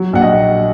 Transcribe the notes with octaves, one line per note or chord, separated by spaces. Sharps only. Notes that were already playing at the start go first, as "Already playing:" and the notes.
Already playing: F#3
A#1 F#5
D#5